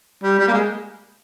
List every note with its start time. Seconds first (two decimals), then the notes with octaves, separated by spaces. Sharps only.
0.23 G3
0.39 G3
0.48 A#3
0.54 G#3